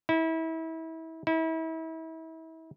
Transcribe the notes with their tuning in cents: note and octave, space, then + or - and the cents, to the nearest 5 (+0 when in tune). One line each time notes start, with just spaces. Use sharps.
E4 -30
E4 -35